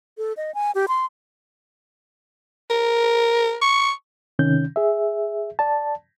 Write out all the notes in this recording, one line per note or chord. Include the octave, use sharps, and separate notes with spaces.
A4
D#5
G#5
G4
C6
A#4
C#6
C3 D#3 C#4 G6
G#4 E5
D5 A5